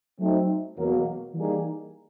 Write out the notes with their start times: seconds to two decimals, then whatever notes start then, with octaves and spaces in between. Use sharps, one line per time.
0.19 F#3 A3 C4 D#4
0.77 E2 B2 F#3 A#3
1.35 E3 G3 A#3 D#4 G#4